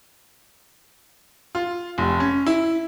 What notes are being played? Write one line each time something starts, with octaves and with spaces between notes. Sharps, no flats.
F4
F1
C#4
E4